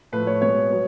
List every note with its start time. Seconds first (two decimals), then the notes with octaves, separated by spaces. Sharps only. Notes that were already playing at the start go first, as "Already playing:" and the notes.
0.12 A2 F3 A3 B4
0.27 C#5
0.42 B2 G#3 B3 C#5
0.71 F#3 B3